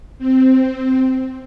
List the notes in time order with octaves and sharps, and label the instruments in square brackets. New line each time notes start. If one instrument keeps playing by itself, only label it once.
[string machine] C4